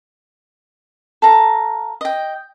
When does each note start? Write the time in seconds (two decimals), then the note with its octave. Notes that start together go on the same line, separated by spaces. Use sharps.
1.22 A4 F5 A#5
2.01 D#5 G5